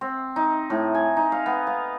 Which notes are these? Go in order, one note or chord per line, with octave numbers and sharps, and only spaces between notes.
C4
D#4
A2
G#5
D#4
F5
B3
F5